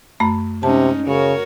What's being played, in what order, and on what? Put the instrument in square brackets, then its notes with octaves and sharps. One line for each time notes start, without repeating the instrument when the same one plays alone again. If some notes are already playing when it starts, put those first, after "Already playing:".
[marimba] F#2 A3 B5
[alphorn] C3 [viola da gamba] G#3 C#4 D#4 [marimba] A5
[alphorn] C#3 [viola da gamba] F#4 A#4 C#5